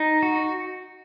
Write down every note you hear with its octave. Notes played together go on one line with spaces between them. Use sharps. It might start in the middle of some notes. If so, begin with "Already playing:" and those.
Already playing: D#4
F#4